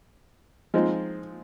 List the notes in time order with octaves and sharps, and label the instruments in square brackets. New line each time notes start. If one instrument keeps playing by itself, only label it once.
[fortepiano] F3 G#3 C4 D#4